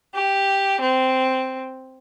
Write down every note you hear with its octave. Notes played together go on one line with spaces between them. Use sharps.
G4
C4